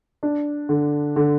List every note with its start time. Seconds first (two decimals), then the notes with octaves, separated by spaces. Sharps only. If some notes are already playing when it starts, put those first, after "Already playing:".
0.23 D4
0.69 D3
1.16 D3